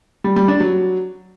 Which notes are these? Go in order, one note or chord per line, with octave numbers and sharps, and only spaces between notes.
G3
G3
D4
F#3